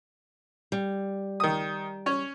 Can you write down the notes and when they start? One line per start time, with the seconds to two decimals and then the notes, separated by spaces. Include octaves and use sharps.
0.72 G3
1.40 D#3 D#6
2.06 C#4 C#5